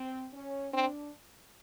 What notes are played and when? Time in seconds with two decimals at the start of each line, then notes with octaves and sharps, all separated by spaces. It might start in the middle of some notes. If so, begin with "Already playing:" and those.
Already playing: C4
0.33 C#4
0.73 C4 D4